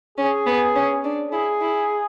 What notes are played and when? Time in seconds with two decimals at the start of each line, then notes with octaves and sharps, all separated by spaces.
0.18 C#4 G#4
0.46 B3
0.75 C#4
1.04 D4
1.32 E4 G#4
1.61 E4